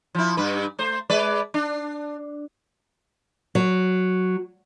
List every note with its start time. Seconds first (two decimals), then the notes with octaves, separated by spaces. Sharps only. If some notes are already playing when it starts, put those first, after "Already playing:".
0.15 F3 E4
0.37 G2 B4
0.79 A3 C5
1.10 G#3 B4 D5
1.54 D4
3.55 F#3